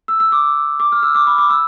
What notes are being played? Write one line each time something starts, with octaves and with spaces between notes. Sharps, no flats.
E6
E6
D6
D6
F6
E6
D6
B5
D6
E6